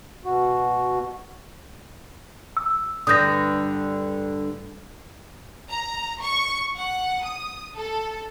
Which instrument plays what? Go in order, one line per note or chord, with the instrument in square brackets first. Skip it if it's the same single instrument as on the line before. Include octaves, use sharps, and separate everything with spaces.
[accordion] B2 F#4
[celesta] E6
[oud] G2 D3 [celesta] D#6 G6 A#6
[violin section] A#5
C#6
F#5
D#6
A4